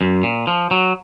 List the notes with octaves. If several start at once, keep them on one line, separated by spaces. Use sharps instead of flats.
F#2
A#2
F3
F#3